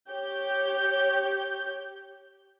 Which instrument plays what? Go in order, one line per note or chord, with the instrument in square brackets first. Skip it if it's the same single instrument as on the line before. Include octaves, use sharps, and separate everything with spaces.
[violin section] G4 C#5 G6